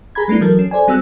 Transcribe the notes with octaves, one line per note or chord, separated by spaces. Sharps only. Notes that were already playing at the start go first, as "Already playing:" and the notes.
G#4 A#5 B5 G#6
G3 A3 B3 D4 E4
E3 F#3 A4 A#4
C#4
A4 C5 D5 G#5
G3 C4 F#4 E6 F#6